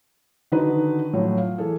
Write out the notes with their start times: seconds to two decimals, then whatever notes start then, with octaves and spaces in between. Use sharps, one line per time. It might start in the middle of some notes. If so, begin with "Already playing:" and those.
0.52 D3 D#3 D#4 F#4 B4
1.13 A2 F3 F#3
1.38 F5
1.58 E3 G#4 A4